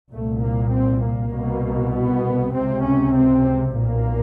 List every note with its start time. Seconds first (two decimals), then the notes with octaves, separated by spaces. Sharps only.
0.12 C2 A#2 A3
0.43 A#3
0.73 C4
1.03 A#3
1.34 C2 B2
1.94 B3
2.55 C#2 C3 C4
2.85 C#4
3.16 C4
3.76 B1 A#2 A#3